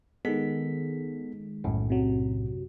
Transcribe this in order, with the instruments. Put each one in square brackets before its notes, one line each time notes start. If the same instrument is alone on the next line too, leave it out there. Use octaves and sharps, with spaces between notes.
[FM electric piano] D#3 G#3 [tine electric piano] B3 A4 B6
[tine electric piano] B1 F#2 A2
[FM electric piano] C3 F#3